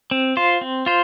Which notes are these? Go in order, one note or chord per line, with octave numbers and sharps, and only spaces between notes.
C4
F4 C5
C4
F4 C5